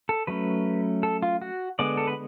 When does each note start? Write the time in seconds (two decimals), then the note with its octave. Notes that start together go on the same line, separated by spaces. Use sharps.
0.09 A4
0.27 F#3 A3 C#4 B4
1.03 A4
1.22 F4
1.41 F#4
1.79 D3 G#3 B3 D5
1.97 A4
2.07 B4